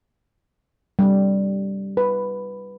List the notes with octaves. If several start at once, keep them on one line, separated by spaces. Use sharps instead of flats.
G3
B4